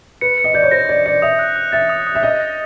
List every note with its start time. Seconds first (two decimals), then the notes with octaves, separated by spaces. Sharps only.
0.21 B4 C#7
0.38 C#7
0.44 D#5
0.54 D5 G6
0.63 C#5
0.71 C5 A#6
0.89 D5 A#6
1.06 D5 C#7
1.22 E5 D#6
1.39 F#6
1.56 F#6
1.72 E5 A6
1.89 D#6
2.07 D#6
2.15 E5
2.23 D#5 F#6
2.40 A#6